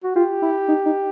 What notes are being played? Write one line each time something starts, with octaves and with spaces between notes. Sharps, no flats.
F#4
F4 G4
E4
D#4
D#4